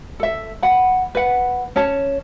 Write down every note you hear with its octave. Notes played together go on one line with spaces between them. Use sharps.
A4 E5
F#5 B5
B4 F#5
C#4 C#5 A5